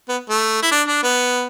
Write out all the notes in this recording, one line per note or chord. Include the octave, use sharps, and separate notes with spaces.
B3
A3
E4
D4
D4
B3